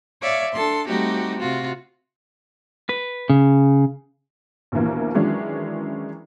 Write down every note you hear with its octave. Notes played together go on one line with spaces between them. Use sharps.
C#5 D5 E5 F5
D4 A4 C6
G3 A3 C4 D#4 F#4 G4
C3 F4 F#4
B4
C#3
A#1 D#2 B2 E3 A#3
D#3 E3 F#3 G#3 C#4 D4